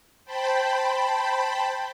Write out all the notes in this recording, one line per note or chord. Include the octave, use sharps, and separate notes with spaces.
C5 G5 A5 B5